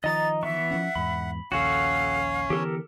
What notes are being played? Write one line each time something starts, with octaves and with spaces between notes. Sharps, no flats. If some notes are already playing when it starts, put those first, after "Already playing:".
D#3 F3 D#5 A#5 D#6 A6
E3 B3 E5 C#6
F3 C#4 F#5
E2 G#2 B5
A#1 D#2 C#4 F#4 A4 C#5 F5
D3 E3 B3 G4 A4 A#4